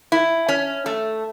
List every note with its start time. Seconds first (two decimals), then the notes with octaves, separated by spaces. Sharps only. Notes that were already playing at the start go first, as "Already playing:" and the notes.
0.12 E4
0.49 C#4
0.86 A3